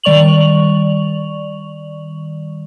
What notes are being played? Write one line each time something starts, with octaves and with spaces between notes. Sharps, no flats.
D#3 G3 D5 C#6 F7 F#7